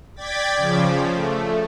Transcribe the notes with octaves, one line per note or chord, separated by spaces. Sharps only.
D5 G5 D6 G#6 A6 B6
C#3 F3
A3